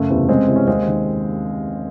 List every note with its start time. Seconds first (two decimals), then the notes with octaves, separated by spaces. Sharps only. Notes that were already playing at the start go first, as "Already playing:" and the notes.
Already playing: F#1 A3
0.10 E2 C3 E3
0.29 C2 G#3 C4
0.48 C3 E3
0.56 C#4
0.67 D#2 G#3 C4
0.87 D#3